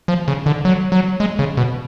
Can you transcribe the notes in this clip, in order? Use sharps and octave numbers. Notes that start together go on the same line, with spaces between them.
F3
C#3
D3
F#3
F#3
G#3
C#3
B2